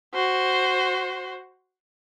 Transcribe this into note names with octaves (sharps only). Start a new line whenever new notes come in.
F#4 C5